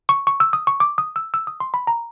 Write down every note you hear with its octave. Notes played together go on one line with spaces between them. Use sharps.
C#6
C#6
E6
D#6
C#6
D6
D#6
E6
E6
D#6
C6
B5
A#5